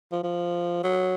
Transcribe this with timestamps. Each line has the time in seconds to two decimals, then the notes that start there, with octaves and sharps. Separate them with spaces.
0.12 F3
0.23 F3
0.83 F#3